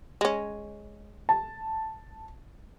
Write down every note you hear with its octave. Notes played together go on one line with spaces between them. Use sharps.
G#3 C#4
A5